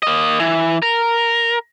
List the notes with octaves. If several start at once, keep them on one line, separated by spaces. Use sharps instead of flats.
A#3 D#5
E3
A#4